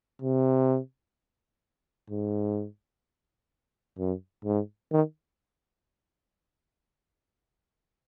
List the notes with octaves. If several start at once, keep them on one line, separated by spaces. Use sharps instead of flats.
C3
G#2
F#2
G#2
D#3